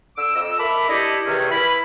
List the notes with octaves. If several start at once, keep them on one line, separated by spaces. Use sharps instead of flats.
D3 D6 E6
F2 D#5 E6
A4 A#4 E5 B5 D6
D4 E4 G4 A4 D#5
E2 C3 D#3 C4 C#4
E3 E4 B5